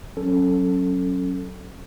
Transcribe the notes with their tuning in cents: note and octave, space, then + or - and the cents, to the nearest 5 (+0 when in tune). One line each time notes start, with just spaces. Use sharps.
F#3 +0 C#4 -15 A4 +0